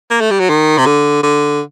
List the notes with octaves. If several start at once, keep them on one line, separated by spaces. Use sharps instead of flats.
A#3
A3
G3
F#3
D#3
C3
D3
D3